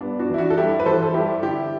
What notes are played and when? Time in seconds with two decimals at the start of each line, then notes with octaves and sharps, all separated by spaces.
0.01 G2 B3 D4
0.19 D4 F#4
0.30 E3 E4
0.38 D4 F#4
0.50 A4
0.57 G2 E4 G4
0.80 B4
0.85 E3 A4 C5
1.02 A4
1.14 G2 E4 G4
1.42 D3 E4 G4